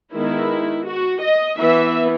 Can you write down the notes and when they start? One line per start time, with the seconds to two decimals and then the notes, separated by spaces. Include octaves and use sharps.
0.13 D#3 G#3 B3 E4
0.86 F#4
1.23 D#5
1.59 E3 B3 E5